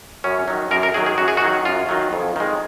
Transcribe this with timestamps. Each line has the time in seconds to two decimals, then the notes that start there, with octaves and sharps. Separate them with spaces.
0.24 F#2 C#4
0.48 D#3 F#3
0.71 F#2 A#4
0.83 A#4
0.94 D#3 F#3 G#4
1.06 G#4
1.18 F#2 F#4
1.28 G#4
1.37 F#4
1.42 D#3 F#3
1.65 F#2 F4
1.89 D#3 F#3
2.13 F2
2.36 D#3 G#3